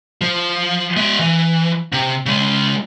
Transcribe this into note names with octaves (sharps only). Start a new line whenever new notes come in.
F3
G#3 E5
E3
C3
C#3 G#3